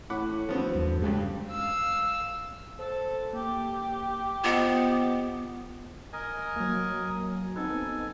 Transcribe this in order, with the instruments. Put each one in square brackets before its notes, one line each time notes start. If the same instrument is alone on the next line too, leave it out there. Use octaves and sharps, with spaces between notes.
[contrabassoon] A2 [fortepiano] F#5 B5 D6
[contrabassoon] D2 [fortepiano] F3 B3 C4
[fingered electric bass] E2 G2
[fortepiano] G2 C#3 G3 [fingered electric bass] G#3
[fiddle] F5 E6
[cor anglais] A4 [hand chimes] C5
[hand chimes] A#3 [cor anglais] G4
[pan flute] B3 [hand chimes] F4 C5 D#5
[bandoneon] A#4 D#5 G#5
[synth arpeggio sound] F#3 A#3
[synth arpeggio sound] B3 C4 D#4 [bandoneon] A4 G#5